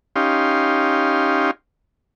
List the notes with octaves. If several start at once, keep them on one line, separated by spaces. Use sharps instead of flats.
C#4 D#4 G4 F5 C6